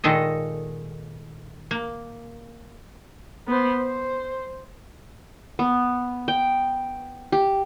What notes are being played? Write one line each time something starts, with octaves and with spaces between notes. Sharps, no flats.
A#2 D#3 G#3 A4 D#5
A#3
B3 C5
C5
B3
G5
G4